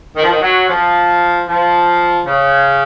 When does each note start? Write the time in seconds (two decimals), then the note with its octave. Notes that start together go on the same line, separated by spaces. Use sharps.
0.16 D#3
0.23 F3
0.30 D#3
0.41 F#3
0.68 F3
1.48 F3
2.26 C#3